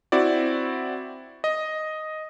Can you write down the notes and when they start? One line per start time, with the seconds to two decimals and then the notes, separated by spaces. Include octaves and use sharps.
0.12 C4 E4 F#4 D5
1.44 D#5